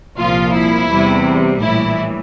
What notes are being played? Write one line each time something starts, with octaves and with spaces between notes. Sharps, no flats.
C2 A#2 F3 F4
E4
E2 C3 G3
A#1 A2 E3 G3 E4